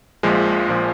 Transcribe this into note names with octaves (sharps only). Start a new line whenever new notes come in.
A#1 A#2 F3 G#3
A#1 A#2 F3